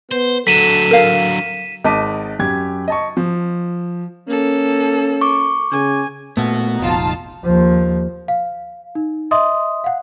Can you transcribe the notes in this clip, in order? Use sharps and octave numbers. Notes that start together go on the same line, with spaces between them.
B3 C5
D3 F#3 A4 B6 D#7 E7
A#4 F5 D#7
G#1 D#5 A5 D6 B6 D#7
F#2 G4 G#6
D#5 A5 C#6
F3
A#3 C#4 A4
C#6 D6
C#3 G#5
A#2 A3 B3 F#4
F1 A#1 D#4 F4 A5
D#2 F3
F5
D#4
D#5 E5 C6 D#6
F5 F#5